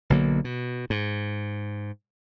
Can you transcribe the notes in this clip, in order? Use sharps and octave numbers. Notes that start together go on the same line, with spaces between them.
B1 D3 F#3 A#3
B2
G#2